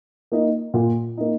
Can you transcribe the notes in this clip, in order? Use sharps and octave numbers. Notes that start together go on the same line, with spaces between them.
A#3 D#4
A#2
A#3 D#4